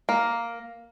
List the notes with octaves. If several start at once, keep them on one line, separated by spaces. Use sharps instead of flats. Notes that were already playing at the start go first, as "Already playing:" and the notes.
A#3